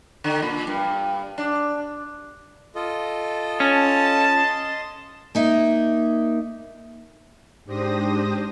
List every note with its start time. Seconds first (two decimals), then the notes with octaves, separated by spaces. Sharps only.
0.24 D3
0.42 A#2
0.67 G2
1.38 D4
2.75 F4 A4 D#5
3.60 C#4 A5
4.36 D#5 C6
5.35 A#3 D#4 E5
7.65 G#2 D4 G4 C5 D#6 A#6